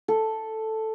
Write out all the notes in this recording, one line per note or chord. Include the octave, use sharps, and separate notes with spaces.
A4